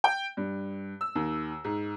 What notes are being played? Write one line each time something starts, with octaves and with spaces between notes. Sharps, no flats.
G5
G2
E6
D#2
G#2